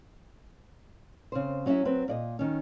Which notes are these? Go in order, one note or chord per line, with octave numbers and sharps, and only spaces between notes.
C#3 C4 C5
F#3 C#4 D4 E4 E5
F#3 C4 B4
A#2 D5 D#5
D#3 C#4